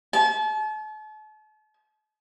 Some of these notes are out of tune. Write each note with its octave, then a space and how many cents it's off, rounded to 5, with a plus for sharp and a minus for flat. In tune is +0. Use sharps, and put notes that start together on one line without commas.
A5 -40